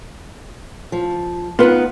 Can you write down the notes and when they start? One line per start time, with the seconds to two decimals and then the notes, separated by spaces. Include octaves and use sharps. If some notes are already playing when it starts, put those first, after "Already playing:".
0.92 F3
1.59 B3 D#4 F4 B4